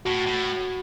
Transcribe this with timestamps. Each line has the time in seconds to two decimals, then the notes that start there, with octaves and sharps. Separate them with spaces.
0.05 A2 F#4
0.26 A2